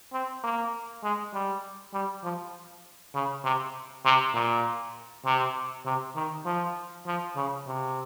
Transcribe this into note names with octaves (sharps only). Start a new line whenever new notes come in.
C4
A#3
G#3
G3
G3
F3
C#3
C3
C3
A#2
C3
C3
D#3
F3
F3
C#3
C3